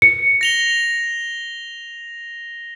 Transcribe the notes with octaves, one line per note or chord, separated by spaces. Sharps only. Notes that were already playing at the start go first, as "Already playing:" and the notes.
C#7
A#6 F7 G7